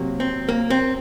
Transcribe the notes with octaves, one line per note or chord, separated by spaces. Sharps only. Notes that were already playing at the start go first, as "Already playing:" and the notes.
Already playing: C3 F#3 A#3
C4
A#3
C4